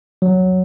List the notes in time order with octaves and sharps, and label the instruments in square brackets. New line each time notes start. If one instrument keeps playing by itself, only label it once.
[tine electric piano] F#3